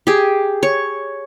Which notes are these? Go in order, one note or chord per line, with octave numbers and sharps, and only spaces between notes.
G4 G#4
C#5